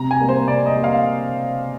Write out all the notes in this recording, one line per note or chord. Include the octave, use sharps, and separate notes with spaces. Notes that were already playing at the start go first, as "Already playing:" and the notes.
Already playing: C3 A#5
G#5
G3 A#3
C5
C3 D5
D#5
G3 A#3
F5